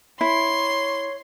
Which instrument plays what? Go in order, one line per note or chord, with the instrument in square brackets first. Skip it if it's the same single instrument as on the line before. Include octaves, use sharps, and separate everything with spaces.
[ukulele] E4 [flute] C#5 [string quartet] C6